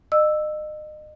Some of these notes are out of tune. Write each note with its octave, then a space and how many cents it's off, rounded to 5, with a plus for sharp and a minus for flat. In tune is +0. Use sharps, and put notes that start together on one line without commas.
D#5 -35 E6 +0